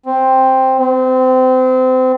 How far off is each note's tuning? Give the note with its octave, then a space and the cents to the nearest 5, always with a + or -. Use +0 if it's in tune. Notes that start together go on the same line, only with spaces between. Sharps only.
C4 +5
C4 -25